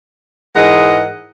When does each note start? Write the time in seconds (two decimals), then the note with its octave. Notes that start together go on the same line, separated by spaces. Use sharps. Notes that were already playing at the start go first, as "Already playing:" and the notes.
0.56 G#2 E3 G#3 A#4 D#5 F#5